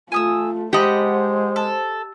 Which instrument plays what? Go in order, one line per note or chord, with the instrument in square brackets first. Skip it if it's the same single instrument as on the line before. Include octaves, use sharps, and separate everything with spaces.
[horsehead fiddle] A3 F4 [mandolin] G#5 D#6 E6
[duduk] G#3 [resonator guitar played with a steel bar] G4 D#5 [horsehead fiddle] C5 [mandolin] F#5 A5 B5
[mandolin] A4